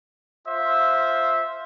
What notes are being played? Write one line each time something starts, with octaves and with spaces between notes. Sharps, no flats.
F4 C5 E5